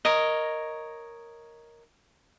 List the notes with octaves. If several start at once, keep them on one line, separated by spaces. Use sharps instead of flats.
A#4 C#5 D#5